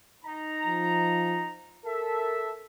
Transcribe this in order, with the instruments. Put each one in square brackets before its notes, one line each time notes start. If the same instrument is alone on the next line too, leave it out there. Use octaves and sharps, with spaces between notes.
[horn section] D#4 A#5
[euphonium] F3
[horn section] A4 E5 A5 [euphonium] A#4